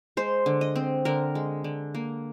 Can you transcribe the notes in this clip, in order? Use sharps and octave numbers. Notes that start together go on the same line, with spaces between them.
G#3 C5
D3
D#5
C4
D3 A#4
G#3
D3
A#3